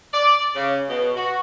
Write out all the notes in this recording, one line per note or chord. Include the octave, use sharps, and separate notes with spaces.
D5
C#3
B2
F#4